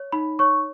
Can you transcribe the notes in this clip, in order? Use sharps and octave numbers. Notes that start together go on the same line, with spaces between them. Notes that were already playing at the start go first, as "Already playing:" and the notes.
Already playing: C#5
D#4 B5
C#5 C#6